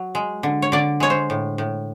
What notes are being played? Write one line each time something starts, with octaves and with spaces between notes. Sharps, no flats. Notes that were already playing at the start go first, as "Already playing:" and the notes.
Already playing: F#3
G#3
D3
C#5
D3 D5
G#3 C#5
C5
A2
A2